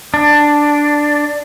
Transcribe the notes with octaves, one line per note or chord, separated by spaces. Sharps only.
D4